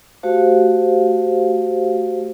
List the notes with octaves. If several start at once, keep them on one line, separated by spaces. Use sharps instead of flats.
A3 F#4 G4 C5 F5